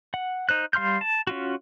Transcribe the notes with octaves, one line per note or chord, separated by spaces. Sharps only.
F#5
D#4 C5 F#6
G3 F5 C6 F6 G6
A5
C#4 F4 F#4